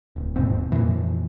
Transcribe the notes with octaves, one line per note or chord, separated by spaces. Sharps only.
D1
D#2 G#2 B2 C4
F2 A#2 E3